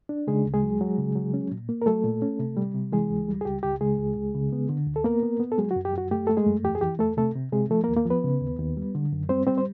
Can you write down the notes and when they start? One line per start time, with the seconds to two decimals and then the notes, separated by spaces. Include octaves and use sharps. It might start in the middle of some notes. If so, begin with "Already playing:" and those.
0.09 D4
0.27 C#3 G#3 G#4
0.45 D2
0.54 G#3 G#4
0.63 F#3
0.81 F#3
0.98 C#3
1.15 F#3
1.34 C#4
1.52 A#2
1.69 A#3
1.82 A#4
1.86 F#3 A3 A4
2.04 A#2
2.22 C#4
2.39 C3
2.57 G3
2.75 C3
2.92 E3 G#3 G#4
3.10 C#2
3.29 G3
3.41 G#4
3.45 C#2 G4
3.63 C#2 G4
3.81 C#3 G#3 G#4
3.98 C#2
4.16 C#2
4.35 C#3
4.53 B3
4.69 D3
4.87 D2
4.96 A4
5.04 A#3 B3 A#4
5.23 B3
5.40 B3
5.52 A4
5.58 F#3 G#3 G#4
5.71 F#4
5.76 F#2
5.85 G4
5.93 F#2 F#4
6.11 A3 G4
6.27 A3 A4
6.37 G#3 G#4
6.47 F#2
6.64 E2 G4
6.75 G#4
6.81 E3 G4
6.99 E2 A3 A4
7.17 C3 A3 A4
7.36 C3
7.52 C3 G#3 G#4
7.70 F3 A3 A4
7.84 A#3 A#4
7.88 D#2
7.96 A#3 A#4
8.05 F3
8.10 B3 B4
8.24 C#3
8.41 D#2
8.59 D#2
8.77 G3
8.95 D3
9.13 F#2
9.29 G3 C4 C5
9.47 G3 C4 C5
9.58 C5